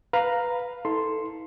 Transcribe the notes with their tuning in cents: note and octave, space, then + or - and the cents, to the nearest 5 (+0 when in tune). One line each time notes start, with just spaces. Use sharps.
B4 +0 F5 +5 A#5 +0
E4 -40 A4 +0 C6 +0